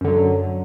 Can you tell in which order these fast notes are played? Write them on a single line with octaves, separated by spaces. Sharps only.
F#2 D3 F#3